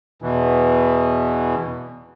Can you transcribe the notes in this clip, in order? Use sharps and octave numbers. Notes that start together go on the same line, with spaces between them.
E2 B2 E3